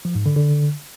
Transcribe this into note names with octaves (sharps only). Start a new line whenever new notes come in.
F3
G#2
D3
D3